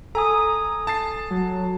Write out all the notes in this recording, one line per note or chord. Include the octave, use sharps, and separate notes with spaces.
A4 G#5 A#5 D#6
A5 A6 C7
F#3